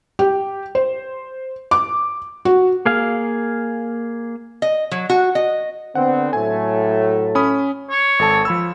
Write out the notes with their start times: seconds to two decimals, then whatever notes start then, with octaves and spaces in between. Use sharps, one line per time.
0.19 G4
0.75 C5
1.71 D6
2.45 F#4
2.85 A#3 G#4 F5
4.62 D#5
4.91 F#3
5.09 F#4
5.35 D#5
5.95 D3 B3 C4 F#5
6.33 A2 F#3 A3 G#5
7.35 C#4 B5 D#6
7.90 C#5
8.19 G#1 A4 A5
8.45 F3 B5 E6